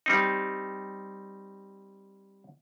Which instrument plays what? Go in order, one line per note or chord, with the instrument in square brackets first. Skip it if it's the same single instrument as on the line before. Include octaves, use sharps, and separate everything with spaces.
[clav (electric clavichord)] G3 C4 D#4